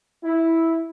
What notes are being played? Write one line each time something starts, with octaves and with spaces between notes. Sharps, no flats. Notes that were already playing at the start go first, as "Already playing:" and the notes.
E4